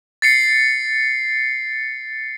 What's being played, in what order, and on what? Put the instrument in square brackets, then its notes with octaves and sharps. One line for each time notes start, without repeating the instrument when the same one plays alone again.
[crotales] A6 C7 C#7